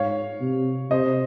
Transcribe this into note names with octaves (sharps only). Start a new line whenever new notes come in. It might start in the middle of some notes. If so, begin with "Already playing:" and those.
Already playing: G#2 C#5 F5
C3
C3 C5 D#5